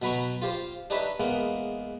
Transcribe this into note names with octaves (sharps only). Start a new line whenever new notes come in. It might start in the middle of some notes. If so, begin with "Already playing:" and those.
B2 F#3 B4 A#5 C#6
F4 G4 C5
D4 D#4 G4 B4 C#5 E5
E2 G#3 A#3 B3